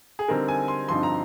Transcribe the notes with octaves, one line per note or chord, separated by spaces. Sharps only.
G#4
D3 G3 C4 D#4 A#4
G#5
C6
G2 D3 F3 C4 D#4 C6
A#5